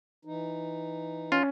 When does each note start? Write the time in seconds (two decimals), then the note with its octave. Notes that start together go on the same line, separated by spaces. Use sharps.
0.25 E3 D#4
1.32 C#4 F4